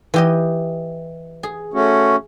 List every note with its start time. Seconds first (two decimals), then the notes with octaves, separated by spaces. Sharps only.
0.14 E3 G4 D#5
1.43 G#4
1.74 A3 C#4 F#4